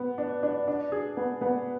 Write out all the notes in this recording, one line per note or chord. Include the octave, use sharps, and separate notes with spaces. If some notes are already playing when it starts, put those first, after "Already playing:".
Already playing: B3
D4
D4
D4
G#4
B3
B3